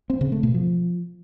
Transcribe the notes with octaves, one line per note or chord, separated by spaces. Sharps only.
C4
C#3
A3
B2
F3